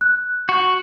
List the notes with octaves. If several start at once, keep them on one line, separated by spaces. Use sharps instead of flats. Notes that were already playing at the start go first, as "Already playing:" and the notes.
F#6
F#4